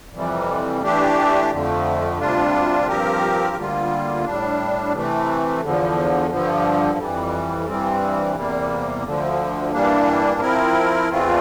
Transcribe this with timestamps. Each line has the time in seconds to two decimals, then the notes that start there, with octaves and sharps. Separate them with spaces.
0.14 F2 C3 E3 G3
0.82 E3 A3 D4 G4
1.51 F2 D3 F3 A3
2.19 D2 C3 G3 D4 F4
2.87 G2 F3 C4 G4 A#4
3.56 D2 D3 G3 A#3 F4
4.24 A2 G3 D4
4.93 C3 E3 A3
5.62 E2 D3 F3
6.30 G2 D3 F3
6.99 F2 E3 G3
7.66 G2 E3 G3 C4
8.35 E2 C3 G3 A#3
9.04 D2 D3 F3
9.72 G2 E3 G3 A#3 D4
10.41 F3 C4 E4 A#4
11.09 E2 E3 A3 C4 F4